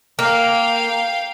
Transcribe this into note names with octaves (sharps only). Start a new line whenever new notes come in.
A#3 F5 G5